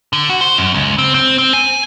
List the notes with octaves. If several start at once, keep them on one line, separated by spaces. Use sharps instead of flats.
D3
F#4
C5
F#2
C#2
C4
C4
C4
G#5